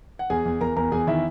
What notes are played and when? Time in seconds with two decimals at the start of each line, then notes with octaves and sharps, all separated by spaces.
0.19 F#5
0.30 E2 G#4 G#5
0.45 E2
0.61 E2 A#4 A#5
0.76 E2 A#4 A#5
0.92 E2 G#4 G#5
1.07 D#3 E4 E5